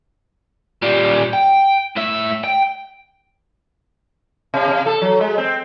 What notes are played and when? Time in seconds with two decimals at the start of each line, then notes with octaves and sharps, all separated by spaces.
0.82 A#2 G3
1.33 G5
1.96 A2 E5
2.44 G5
4.54 C3
4.68 C3
4.86 A4
5.02 F#3
5.21 G#3
5.38 C4